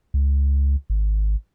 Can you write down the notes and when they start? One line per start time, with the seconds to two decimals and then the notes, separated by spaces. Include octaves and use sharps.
0.14 C#2
0.90 G#1